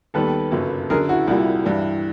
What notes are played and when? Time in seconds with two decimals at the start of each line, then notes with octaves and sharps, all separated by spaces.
0.14 D#2 D#3 G3 B3 A4 B4
0.52 G1 F#2 C#3 F#3 A#3
0.90 F#2 D3 F#3 G#4 A#4
1.09 E4 F#4
1.27 C2 A#2 G3 E4 F#4
1.65 G2 E3 G3